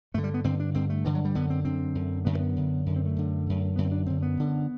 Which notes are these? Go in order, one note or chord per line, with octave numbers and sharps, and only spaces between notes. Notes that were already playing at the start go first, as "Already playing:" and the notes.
G2 D3 A3
G3
B3
G2 D3 C4
D4
G2 D3 C4
A3
G2 D3 E3
F#3
G3
F#2 D3 B3
C4
F#2 D3 C4
F#2 D3
F#2 D3 B3
A3
B3
F#2 D3
F#2 D3
C4
A3
F#2 D3
F#2 D3
F#2 D3 B3
C4
D4
F#2 D3 C4
B3
F#2 D3